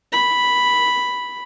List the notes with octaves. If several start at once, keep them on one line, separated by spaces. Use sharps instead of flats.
B5